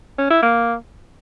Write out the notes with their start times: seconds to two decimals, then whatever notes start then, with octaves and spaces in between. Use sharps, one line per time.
0.19 C#4
0.30 E4
0.42 A#3